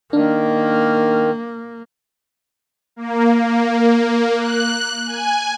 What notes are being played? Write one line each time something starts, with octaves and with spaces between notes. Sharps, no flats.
D#3 A#3 D4
A#3
A#3
F#6
G#5